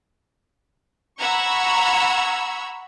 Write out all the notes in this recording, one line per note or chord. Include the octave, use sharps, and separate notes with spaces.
F#5 A#5 B5 C#6 E6 G#6